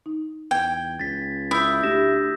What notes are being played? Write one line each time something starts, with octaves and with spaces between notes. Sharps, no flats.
D#4
E2 G5 G#6
C#2 A6 B6
E4 D#6 E6 G6
D2 G4 A#6 E7